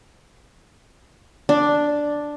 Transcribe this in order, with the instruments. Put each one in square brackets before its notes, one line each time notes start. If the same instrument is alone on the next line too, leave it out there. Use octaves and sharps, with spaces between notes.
[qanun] D4